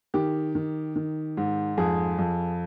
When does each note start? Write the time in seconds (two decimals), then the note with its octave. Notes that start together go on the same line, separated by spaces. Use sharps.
0.14 D#3 G4
0.55 D#3
0.96 D#3
1.37 G#2
1.77 F2 G#4
2.18 F2